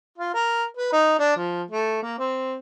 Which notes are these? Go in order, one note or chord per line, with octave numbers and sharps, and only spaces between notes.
F4
A#4
B4
D#4
D4
F3
A3
A#3
C4